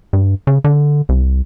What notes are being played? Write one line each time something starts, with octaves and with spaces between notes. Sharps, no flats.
G2
C#3
D3
C2